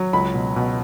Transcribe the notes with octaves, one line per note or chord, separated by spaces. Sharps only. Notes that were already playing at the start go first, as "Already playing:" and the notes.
Already playing: F#3
C#2 B5
B2
B2